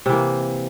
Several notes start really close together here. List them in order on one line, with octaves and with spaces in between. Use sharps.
C3 E3 A#3